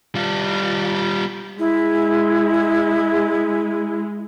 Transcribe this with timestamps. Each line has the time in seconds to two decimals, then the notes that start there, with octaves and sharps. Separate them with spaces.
0.15 G3 F4
1.59 G#3 E4